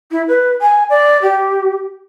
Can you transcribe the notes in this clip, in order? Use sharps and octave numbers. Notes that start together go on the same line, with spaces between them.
E4
B4
G#5
D5
G4